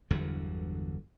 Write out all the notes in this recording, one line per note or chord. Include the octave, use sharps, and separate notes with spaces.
G1 E2 D3 F#3